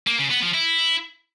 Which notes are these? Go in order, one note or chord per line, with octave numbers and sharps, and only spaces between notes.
A#3
C#3
B3
F3
E4